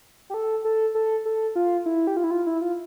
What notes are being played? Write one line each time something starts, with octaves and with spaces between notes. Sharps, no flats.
G4
A4
A4
A4
A4
F4
E4
G4
F4
E4
F4
E4
F4